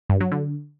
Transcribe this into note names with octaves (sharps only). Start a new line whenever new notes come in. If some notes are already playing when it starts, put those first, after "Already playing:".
G2
F#3
D3